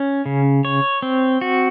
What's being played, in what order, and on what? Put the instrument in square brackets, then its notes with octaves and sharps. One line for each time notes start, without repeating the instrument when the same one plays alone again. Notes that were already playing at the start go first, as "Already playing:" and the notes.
Already playing: [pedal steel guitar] C#4
C#3
C#5
C4
F#4